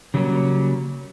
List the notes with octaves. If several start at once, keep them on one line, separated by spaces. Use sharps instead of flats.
C#3 F#3 G3 A#3 C#4